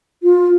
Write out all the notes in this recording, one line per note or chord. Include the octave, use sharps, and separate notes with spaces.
F4